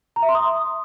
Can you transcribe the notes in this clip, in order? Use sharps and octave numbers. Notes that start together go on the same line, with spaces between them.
A#5
E5
C6
D#6